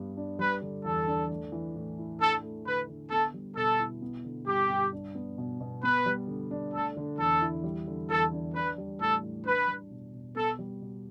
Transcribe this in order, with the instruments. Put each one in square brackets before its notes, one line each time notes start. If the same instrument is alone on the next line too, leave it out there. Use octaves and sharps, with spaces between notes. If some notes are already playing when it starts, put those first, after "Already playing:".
Already playing: [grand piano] G2 G3 B3
D4
[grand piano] G3 [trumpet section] B4
[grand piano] D3
[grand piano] E2 [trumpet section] A4
[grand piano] D4
A3
E3
A2
E4
[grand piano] D4 [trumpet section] A4
[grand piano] A3
[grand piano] D3 [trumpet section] B4
[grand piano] D3
[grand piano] B3 [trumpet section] A4
[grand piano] G3
[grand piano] B2 [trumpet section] A4
[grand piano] E4
B3
D3
[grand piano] G2 [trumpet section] G4
[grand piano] G2
D4
B3
B2
B2
[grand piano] B3 [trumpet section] B4
[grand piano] G3
D3
D4
[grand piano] A3 [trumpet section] A4
[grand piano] D3
[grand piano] E2 [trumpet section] A4
[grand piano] E4
G3
D3
[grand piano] E2 [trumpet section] A4
[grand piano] D4
[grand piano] D4 [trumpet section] B4
[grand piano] G3
[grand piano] A2 [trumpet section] A4
[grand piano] A2
[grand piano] D4 [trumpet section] B4
[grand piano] G3
B2
B2
[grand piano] B3 [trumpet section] A4
[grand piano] G3
B2